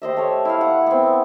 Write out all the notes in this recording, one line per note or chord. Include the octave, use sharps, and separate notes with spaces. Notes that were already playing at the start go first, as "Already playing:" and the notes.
G4 C5 D#5 E5
A3 C#5
E4 F5
F#5
B3 C4